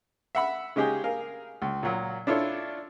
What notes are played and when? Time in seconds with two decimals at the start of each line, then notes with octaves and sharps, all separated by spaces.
0.35 E5 F#5 B5
0.76 C#3 G#3 D#4 G4 G#4
1.04 G#4 A#4 F5
1.62 C#2
1.83 A#2 F#3
2.27 D4 E4 F4 A4 C#5